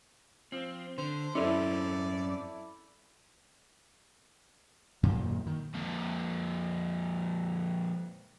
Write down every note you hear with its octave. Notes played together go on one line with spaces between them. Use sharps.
F3 C4
D3 C5
F#2 C4 C#4 E4 A4 D5
F#2 A#2 D#3 A#3
D#3
F2 A#2